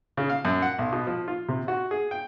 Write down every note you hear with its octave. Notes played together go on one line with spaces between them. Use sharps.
C#3
F5
F#2
F#5
B1
B2
F3
F4
C3
F#4
G#4
G5